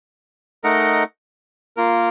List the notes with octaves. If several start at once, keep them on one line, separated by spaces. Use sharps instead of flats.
A3 D#4 A#4 D#5 F#5
A#3 F4 A#4